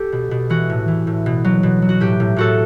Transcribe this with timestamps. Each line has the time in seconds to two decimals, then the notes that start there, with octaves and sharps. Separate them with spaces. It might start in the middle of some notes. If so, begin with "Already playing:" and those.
Already playing: G4 A4
0.12 B2
0.31 B2
0.50 E3 F#4
0.70 A2
0.88 E3
1.07 A2
1.26 B2
1.44 F#3
1.63 B2
1.82 F#3
1.89 F#4
2.00 A2 G4
2.20 A2
2.36 A2 F#4 A4